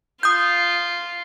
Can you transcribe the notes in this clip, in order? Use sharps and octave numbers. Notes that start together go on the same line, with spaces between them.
F4 D#6 G6